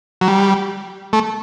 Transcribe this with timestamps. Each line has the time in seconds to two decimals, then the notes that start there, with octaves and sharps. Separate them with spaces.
0.21 F#3
0.28 G3
1.13 A3